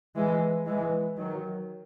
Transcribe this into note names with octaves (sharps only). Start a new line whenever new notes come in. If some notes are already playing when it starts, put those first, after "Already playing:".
E3 G#3
E3 G#3
D#3 F#3